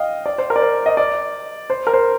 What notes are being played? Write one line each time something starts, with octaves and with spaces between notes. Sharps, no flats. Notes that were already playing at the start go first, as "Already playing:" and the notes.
Already playing: D#5 F5 G5
D5
C5
A#4
D5
C5
D#5
D5
C5
A#4
C5